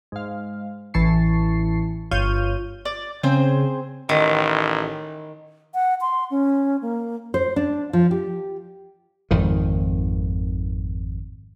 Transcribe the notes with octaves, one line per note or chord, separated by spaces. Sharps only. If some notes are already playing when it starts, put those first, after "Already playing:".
G#2 F5
A1 E3 A5 C#6 C7
G1 F4 C#5 F6 G6 D#7
D5
C#3 C4 G#4 C5
A1 D#3
F#5
C6
C#4
A#3
C5
D4
F3
G4
G#1 F2 D#3